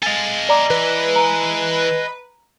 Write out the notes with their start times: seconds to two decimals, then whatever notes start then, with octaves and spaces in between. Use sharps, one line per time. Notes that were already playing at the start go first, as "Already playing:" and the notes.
0.03 A4 D#5 F5 G#5 A6
0.49 D5 A#5 D6
0.70 E3 B4
1.16 A#5